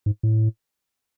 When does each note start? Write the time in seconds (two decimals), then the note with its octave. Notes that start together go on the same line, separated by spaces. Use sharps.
0.06 G#2
0.23 A2